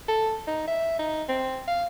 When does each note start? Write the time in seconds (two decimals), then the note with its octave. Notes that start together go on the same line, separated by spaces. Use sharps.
0.08 A4
0.47 D#4
0.68 E5
0.99 D#4
1.29 C4
1.67 F5